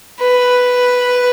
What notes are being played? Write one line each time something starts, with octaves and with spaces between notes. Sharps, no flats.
B4